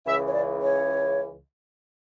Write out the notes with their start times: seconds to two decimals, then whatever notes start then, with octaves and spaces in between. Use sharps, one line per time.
0.06 C#2 C#3 E3 E5
0.26 C#5
0.33 D5
0.61 C#5